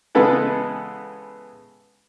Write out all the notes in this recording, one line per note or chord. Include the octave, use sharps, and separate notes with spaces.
C#3 E3 G#3 B3 A4 B4